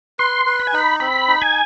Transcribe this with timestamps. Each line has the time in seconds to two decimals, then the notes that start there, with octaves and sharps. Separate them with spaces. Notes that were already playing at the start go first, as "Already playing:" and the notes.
0.19 B4 C6
0.46 B4
0.60 B5
0.67 G#5
0.73 D#4 B5
1.00 C4 B5
1.28 D#4
1.42 G#5